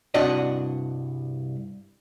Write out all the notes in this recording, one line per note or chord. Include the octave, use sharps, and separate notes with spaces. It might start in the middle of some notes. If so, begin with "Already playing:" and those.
C2 G2 D4 F#4 D5 D#5